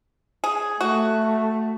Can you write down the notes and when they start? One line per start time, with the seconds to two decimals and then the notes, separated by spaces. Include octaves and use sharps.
0.44 G#4
0.81 A3 F#4